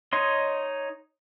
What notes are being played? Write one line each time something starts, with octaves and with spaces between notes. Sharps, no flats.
D#4 C#5 D#5 C6